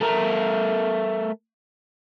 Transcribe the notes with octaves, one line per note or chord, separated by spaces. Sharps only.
A3 A#4